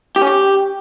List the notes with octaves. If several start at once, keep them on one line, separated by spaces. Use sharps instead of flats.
G4
C#4
G4